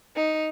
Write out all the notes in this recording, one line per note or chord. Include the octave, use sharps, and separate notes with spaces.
D#4